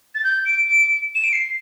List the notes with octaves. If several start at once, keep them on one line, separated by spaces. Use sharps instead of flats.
A6
G6
D7
D7
E7
D7
C7